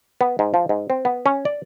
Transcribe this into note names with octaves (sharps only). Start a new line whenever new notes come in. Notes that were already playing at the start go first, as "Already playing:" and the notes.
B3
G#2
F3
G#2
C4
B3
C#4
D5